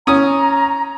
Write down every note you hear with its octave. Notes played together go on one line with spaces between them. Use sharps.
C#4 A#5 D#6